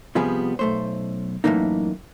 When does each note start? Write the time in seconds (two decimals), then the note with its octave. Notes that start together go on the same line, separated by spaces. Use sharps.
0.15 C3 F3 G3 B3 G#4
0.59 B1 A3 C5
1.44 F#2 A2 C3 E3 A#3 D#4